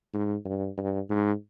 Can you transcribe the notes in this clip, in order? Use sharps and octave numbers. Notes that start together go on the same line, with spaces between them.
G#2
G2
G2
G#2